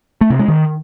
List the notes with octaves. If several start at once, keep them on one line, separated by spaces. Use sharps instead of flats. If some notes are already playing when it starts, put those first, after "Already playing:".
A3
C3
G#3
D#3